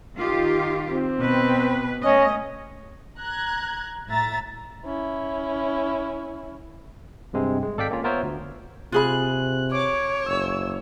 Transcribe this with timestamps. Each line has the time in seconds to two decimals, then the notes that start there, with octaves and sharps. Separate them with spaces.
0.15 D#3 F4 G4
0.88 C4
1.20 B2 B4
2.01 A3 C#4 D#5
3.19 A#5 F#6 G#6
4.09 A2 E5 A#5 A6
4.85 C#4 E4
7.33 G2 C3 G#3 C4
7.63 G#3
7.77 G#1 A4 D5 F5 G5 B6
7.91 A#3 C#4 F4
8.04 B3 F4 A#4 C5 C#5 E5
8.23 D2
8.92 C3 F4 G#4 B5 F#6
9.72 C#5 D6
10.26 F#1 E6